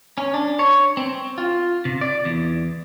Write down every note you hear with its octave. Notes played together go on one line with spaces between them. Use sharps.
C#4
D4
C#5
C4
F4
C3
D5
E2